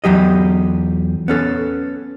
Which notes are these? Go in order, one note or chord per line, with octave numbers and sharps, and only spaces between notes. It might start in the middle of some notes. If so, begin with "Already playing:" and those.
E2 F#3 G4 D#5
B3 C#4 A4